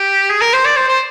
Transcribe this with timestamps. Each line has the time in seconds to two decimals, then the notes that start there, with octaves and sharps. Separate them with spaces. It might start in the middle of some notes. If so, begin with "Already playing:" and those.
Already playing: G4
0.30 G#4
0.41 A#4
0.53 C5
0.65 D5
0.77 C5
0.88 C5